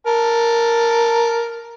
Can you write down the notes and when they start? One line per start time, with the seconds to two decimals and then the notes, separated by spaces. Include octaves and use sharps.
0.07 A#4 A5